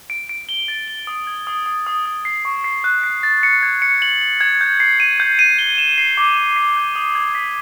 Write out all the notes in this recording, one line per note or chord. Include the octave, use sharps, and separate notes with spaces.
D7
D7
G7
A6
G7
D#6
G#6
D#6
D#6
D#6
D#6
C7
C#6
C7
F#6
C7
A6
C#7
G#6
C#7
F#7
F#7
G#6
G6
C7
D#7
G6
D#7
G7
E7
C7
D6
E7
C7
G6
D#6
G#6
B6